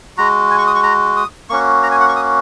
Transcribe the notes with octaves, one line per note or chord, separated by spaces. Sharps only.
G#3 F#4 A#5
G#5
C#6
D#6
C#6
A#5
D#6
A#3 C#4 F#4 C#6
A#5
G#5
F#5
C#6
D#6